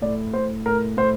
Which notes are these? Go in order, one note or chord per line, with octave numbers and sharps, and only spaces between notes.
A2 D5
A2 C5
A2 A#4
A2 C5